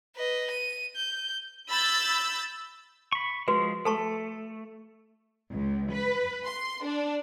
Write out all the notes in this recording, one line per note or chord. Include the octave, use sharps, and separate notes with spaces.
B4 D#5
D#7
G6
B5 E6 G6 A6
B5 C#6
F3 G#3 F#4 B4
A3 A4 A5 C#6
C#2
B4
C6
D4